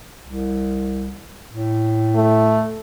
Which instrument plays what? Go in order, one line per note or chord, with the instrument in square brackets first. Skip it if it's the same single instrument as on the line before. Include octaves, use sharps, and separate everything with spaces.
[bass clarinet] C2
A2
[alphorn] A3